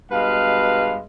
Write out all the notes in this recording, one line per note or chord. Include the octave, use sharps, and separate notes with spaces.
G2 B2 G#3 B4 F5